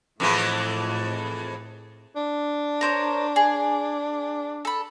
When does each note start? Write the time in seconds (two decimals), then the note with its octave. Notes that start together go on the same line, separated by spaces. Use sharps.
0.20 F2 A2 E3 G#3
2.16 D4
2.81 A#4 C5 C#5
3.36 G#4
4.65 A4 B5